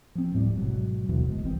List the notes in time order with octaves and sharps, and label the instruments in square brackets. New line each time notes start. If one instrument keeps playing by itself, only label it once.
[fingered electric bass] F3 C4
D1 A2 G3
G#1 D#2 B2 F#3
D#2 B2 D3 E3
F#1 G#3
C2 E3 G3 C4